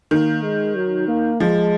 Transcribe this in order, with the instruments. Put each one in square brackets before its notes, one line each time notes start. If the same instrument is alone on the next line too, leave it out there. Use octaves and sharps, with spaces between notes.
[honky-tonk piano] D#3 [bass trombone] A#3
[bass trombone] G#3
F#3
A#3
[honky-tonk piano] F3 [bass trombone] G#3